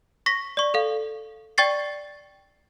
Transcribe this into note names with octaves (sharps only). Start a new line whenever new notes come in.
C#6 A#6 B6
D5 C#6
A4 F5
D5 G5 C#6 A6 C7